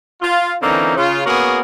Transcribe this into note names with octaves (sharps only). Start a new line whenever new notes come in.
F4
D3 E3 A#3 C4 C#4 D#4
C#3 F4
A#3 B3 C#4 F#4 G#4 A#4